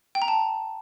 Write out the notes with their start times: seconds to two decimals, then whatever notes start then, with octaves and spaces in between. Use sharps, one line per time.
0.15 G5
0.22 A#5
0.28 A5